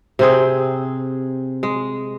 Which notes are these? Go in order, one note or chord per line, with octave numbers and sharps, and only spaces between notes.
C3 C4 G#4
G#3